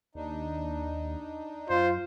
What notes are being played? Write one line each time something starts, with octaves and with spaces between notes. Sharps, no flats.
D#2 D4 D#4
F#2 F4 C5